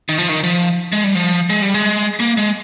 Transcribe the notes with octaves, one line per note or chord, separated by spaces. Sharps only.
D#3
F3
D#3
F3
G#3
G3
F3
G#3
G3
G#3
A#3
G#3